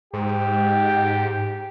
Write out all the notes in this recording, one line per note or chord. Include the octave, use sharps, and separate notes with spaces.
G#2 G4